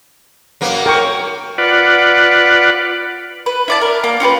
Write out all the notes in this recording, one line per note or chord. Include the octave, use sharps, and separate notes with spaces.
F#2 A#3 B3
A#4 G5 C#6
F4 B4 D5 F#5
B4
E4 D5 A5
A#4
A#3 D6
C#4 F4 G4 B4